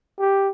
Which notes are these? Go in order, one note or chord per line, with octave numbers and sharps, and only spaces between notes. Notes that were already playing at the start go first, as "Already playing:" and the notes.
G4